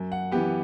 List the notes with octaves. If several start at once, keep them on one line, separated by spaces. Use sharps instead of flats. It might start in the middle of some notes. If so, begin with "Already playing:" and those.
Already playing: F#2
F#5
E3 B3 G4